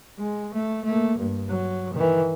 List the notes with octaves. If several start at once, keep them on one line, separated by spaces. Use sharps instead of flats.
G#3
A3
A3 A#3
G2
F#3
D#3 E3